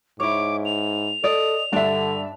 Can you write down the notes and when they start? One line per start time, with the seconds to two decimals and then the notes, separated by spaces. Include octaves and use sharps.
0.20 G#2 E4 C#5 D6
0.65 F7
1.24 A4 D5 D#5
1.73 G2 D3 D4 D5 E5 A5